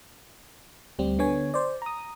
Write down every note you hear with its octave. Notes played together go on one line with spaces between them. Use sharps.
D2 G3 C4
D3 B3 C#5 G#5
C5 D5
A#5 D#6